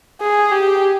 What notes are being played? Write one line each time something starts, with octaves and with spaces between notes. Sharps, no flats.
G#4
G4